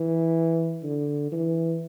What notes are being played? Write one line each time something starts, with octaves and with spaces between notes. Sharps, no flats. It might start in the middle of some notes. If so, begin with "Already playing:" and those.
Already playing: E3
D3
E3